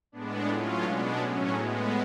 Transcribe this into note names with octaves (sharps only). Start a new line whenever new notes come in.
A2 G#3 B3 D4
A2 F#3 C#4 F4
B2 G#3 B3 D4
A2 F#3 C#4
A2 G#3 B3